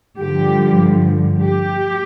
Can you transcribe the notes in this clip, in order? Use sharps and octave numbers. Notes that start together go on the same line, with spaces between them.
G2 D3 F3 G4
G4